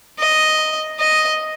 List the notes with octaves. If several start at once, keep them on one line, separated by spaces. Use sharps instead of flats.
D#5
D#5